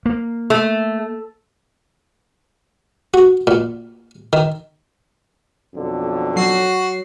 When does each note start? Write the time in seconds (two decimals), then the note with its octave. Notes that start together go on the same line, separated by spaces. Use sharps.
0.06 A#3
0.50 A3
3.14 F#4
3.47 A#2
4.33 D#3
5.74 B1 F2 D3
6.36 F#3 F#4 C7